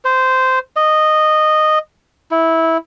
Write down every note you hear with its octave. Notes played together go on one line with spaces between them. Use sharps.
C5
D#5
E4